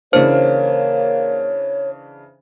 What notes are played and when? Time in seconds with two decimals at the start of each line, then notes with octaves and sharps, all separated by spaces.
0.13 C#3 E3 A#3 D4 C5 C#5